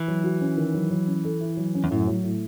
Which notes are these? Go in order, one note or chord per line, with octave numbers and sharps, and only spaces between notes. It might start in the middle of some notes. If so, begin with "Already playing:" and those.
Already playing: E3
F#3
F#4
C#4
D#3
F#3
F#3
C#4
A4
E4
F#3
C#4
E2
F#2 A2
F#3
A2